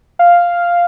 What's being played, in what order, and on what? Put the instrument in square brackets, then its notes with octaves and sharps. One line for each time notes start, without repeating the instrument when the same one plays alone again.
[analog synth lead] F5